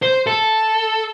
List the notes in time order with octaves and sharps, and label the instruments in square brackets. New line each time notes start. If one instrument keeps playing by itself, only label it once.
[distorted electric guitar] C5
A4